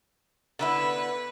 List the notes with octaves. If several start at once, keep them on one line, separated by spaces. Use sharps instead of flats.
D3 B3 E4 B4